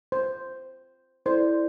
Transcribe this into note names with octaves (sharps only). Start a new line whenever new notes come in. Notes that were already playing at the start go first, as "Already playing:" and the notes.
C5
E4 A4 C5 D5